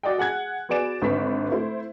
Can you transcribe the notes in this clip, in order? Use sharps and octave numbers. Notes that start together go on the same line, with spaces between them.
F#4 D5 D#5 G5
G#4 F#5 F#6 G#6
B3 F#4 G#4 D5 D7 E7
G#1 D3 B4 C#6 B6
A3 E4 C5